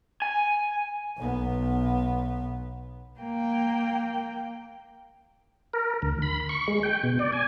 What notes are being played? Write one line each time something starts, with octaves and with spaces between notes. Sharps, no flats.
G#5
B1 B3
A#3 G5
A#4
D2
B5
C#6
G#3
G5
B2
D5
G#5